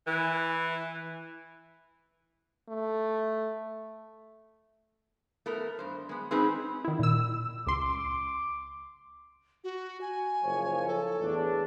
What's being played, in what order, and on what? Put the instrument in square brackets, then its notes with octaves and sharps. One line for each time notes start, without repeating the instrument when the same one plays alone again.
[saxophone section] E3
[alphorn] A3
[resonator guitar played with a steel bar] A3 B3 A#4
G2 C5
G#3 B3
G#3 C4 C#4 D#4 G#4 B4
[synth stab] D#3 E4
A#2 E6
[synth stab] C#2 C6 [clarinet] D6
[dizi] F#4
G#5
[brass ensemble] F#1 F3 C#5
[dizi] A4
[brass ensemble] E2 A2 D4